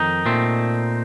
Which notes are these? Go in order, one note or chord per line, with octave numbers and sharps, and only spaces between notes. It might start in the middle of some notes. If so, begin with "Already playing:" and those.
Already playing: F2 D#3 D#4
A#2 A3 C4